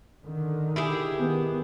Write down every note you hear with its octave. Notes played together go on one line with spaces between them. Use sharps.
D3 D#3
E4 G4 G#4
D#3 B3